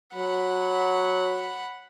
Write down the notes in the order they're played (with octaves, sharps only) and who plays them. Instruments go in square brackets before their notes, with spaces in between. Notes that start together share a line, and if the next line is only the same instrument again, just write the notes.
[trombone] F#3 [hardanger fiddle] F#5 B5